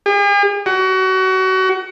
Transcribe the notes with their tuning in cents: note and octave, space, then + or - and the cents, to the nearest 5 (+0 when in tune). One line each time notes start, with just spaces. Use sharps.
G#4 -45
F#4 +30